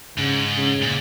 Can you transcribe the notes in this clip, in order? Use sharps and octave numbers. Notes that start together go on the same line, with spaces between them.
G#2 C#3
C#3
A#2